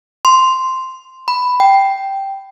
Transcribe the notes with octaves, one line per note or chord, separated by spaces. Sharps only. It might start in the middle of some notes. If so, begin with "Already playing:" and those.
C6
B5
G5